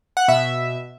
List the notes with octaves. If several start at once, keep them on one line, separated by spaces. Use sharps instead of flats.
F#5
B2 E5